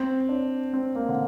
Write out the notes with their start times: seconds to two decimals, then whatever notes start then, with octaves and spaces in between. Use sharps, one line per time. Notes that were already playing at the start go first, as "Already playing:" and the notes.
Already playing: C4
0.29 D4
0.73 C4
0.95 A#3
1.09 D3